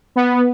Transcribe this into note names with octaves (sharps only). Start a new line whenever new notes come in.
B3